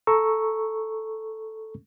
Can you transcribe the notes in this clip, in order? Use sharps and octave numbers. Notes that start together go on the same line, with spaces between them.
A4 A#5 C#6 E6